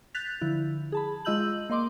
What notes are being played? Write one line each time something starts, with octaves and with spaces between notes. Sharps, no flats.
F#6 G6 A6 B6 F7
D3 F3 E4
G#4 A5 B5
G#3 F4 D#5 E6 G6 F#7
A#3 D#5 C6 D6